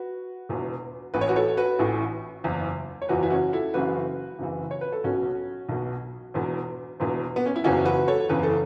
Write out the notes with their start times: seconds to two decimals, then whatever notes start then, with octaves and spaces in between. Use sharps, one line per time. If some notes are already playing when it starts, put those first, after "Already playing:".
Already playing: F#4 B4
0.49 E1 E2 B2
1.14 A1 A2 E3 B4
1.21 C#5
1.28 F#4 B4
1.36 A4 C#5
1.57 F#4 B4
1.79 A1 A2 E3
2.44 F#1 E2 E3
3.02 C#5
3.09 F#1 E2 E3 F#4 B4
3.23 E4
3.30 C#4 F#4
3.53 E4 A4
3.74 F#1 F#2 C#3 E3 F#4 B4
4.39 F#1 F#2 C#3 E3
4.71 C#5
4.81 B4
4.92 A4
5.04 B1 B2 C#4 F#4
5.69 B1 B2
6.34 E1 E2 B2
7.00 E1 E2 B2
7.36 B3
7.46 C#4
7.56 E4
7.64 F#1 E2 C#3 E3 C#4 F#4
7.85 F#4 B4
8.08 A4 C#5
8.29 F#1 E2 C#3 E3 B4
8.43 A4